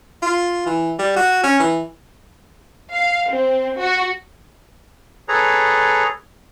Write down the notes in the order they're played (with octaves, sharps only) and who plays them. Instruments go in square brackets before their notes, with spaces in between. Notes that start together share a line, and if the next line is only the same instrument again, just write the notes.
[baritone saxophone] F4
E3
G3
F#4
C#4
E3
[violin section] F5
C4
F#4
[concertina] G#4 A4 B4 C#5 A#5